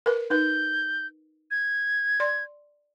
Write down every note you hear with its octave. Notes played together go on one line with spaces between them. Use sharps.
A#4 B4
D#4 B4 G6
G#6
D5 C6